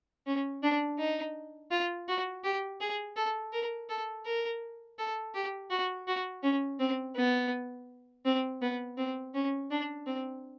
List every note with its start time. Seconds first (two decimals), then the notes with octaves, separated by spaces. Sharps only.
0.27 C#4
0.63 D4
0.99 D#4
1.71 F4
2.08 F#4
2.44 G4
2.81 G#4
3.16 A4
3.53 A#4
3.89 A4
4.25 A#4
4.99 A4
5.35 G4
5.70 F#4
6.07 F#4
6.43 C#4
6.80 C4
7.16 B3
8.26 C4
8.62 B3
8.97 C4
9.35 C#4
9.71 D4
10.07 C4